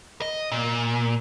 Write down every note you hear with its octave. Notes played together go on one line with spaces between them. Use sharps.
D#5
A#2